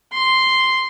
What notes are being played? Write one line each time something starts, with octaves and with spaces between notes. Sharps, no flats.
C6